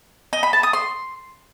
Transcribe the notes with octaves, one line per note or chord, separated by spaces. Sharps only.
D#5
B5
A5
D#6
C6